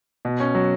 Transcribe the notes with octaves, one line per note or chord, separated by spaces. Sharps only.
B2
C#4
F#3